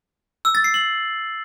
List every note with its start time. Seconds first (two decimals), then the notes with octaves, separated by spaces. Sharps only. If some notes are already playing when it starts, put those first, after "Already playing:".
0.45 E6
0.55 A6
0.64 C7
0.74 F#7